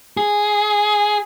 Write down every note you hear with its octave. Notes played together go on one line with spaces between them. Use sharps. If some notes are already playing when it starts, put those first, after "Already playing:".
G#4